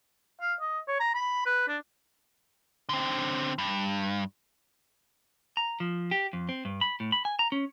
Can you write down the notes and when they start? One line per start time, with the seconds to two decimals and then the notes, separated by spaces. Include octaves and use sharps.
0.41 F5
0.61 D#5
0.88 C#5
1.00 A#5
1.14 B5
1.46 B4
1.68 D4
2.89 D3 C4
3.58 G2
5.57 A#5
5.80 F3
6.11 G4
6.33 F2
6.49 C4
6.65 G2
6.81 B5
7.00 A2
7.12 B5
7.25 G#5
7.39 A#5
7.52 C#4